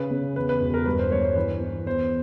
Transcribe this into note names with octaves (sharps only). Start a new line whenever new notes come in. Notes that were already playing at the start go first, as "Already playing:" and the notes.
Already playing: C#3 B4
C#3
E2 B4
B4
E1
A#4
G2 B4
C5
G2 C#5
C5
E3 B4
E3
E2 C5